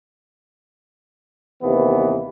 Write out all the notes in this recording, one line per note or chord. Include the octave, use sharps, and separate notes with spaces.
D#2 C3 E3 B3